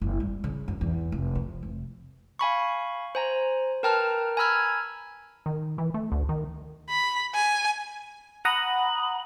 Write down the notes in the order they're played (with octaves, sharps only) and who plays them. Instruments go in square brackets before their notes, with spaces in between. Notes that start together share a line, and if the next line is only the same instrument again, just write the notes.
[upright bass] F#1
G3
C#3
F#2
E2
F1
F3
F1
[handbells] F5 G#5 B5 C#6
C5 G#5 A#5
A#4 B4 G5 A5 A#5 F6
G#5 A#5 B5 E6 F6 G#6
[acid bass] D#3
E3
A3
D2
D#3
[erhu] B5
G#5
[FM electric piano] F#5 A#5 D#6 [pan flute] B5